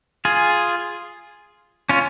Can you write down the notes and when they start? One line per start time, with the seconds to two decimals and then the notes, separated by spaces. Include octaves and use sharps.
0.25 F4 G#4
1.89 C#4 F4